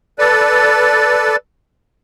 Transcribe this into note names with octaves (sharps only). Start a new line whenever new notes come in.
A4 B4 D5